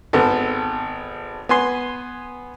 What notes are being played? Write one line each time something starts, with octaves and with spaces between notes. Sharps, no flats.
G#1 B3 A4
B3 G#5 C6